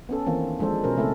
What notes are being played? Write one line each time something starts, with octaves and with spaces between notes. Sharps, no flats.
B3 C#4 A4
D#3 E3 A#3 C4
F3 G#3 D4 A4 C5
B2 C#4 A#4 C5
C#3 A3 C4 E4 A4